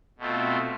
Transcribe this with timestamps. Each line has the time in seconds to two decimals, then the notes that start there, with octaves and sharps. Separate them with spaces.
0.18 B2 A3 C4 F4